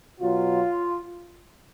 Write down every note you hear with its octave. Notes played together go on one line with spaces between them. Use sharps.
B2 F#3 F4